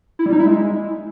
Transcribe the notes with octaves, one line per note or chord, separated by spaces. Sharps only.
E4
G3
D#4
E4
G#3